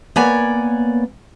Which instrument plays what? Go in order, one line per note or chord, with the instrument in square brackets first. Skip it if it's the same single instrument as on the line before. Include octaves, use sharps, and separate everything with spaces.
[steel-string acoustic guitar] A#3 B3 C#5 D5 G#5